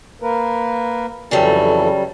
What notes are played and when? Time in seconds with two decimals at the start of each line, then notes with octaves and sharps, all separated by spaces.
0.22 A#3 A#4 B4
1.31 F2 C#3 E3 F#3 G3 A4